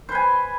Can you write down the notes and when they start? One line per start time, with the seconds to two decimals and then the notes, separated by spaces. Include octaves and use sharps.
0.09 C5
0.12 B4
0.15 G#5